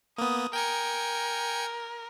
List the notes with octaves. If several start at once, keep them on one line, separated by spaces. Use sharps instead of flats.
A#3 B3 D#6
A#4 G5 G#5 C#7